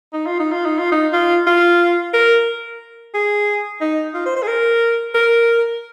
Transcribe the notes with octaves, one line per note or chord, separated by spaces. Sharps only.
D#4
F4
D#4
F4
D#4
F4
D#4
F4
F4
A#4
G#4
D#4
F4
C5
C5
G#4
A#4
A#4